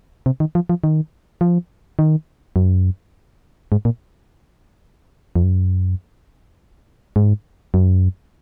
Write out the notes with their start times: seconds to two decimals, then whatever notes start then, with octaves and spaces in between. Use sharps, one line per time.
0.26 C3
0.40 D#3
0.55 F3
0.69 F3
0.84 D#3
1.41 F3
1.99 D#3
2.56 F#2
3.72 G#2
3.85 A#2
5.36 F2
5.43 F#2
7.16 G#2
7.74 F#2